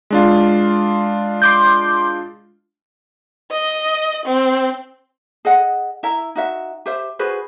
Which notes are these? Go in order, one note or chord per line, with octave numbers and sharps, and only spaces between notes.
G#3 D4 F4
C6 D6 G6
D#5
C4
G#4 D#5 F#5
E4 E5 A#5
D#4 F#4 E5
G4 C5 E5
F#4 G#4 B4 C5